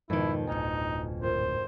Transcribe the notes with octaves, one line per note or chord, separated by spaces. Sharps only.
F2 G#2 B2 D#3 E4
D1 D2 D#4 G#5 F6 C#7
G#1 F4 C5